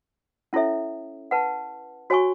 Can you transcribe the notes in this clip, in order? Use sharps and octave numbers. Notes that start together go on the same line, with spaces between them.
C#4 E4 A4 C#5 E5
B4 F#5 A5
F#4 C#5 G#5 C#6